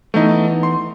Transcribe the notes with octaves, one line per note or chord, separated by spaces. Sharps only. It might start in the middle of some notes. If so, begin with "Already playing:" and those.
E3 A3 B3 D#4
C6